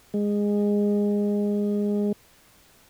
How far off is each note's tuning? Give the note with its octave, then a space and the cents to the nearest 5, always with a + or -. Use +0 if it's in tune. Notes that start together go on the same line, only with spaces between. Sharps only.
G#3 -15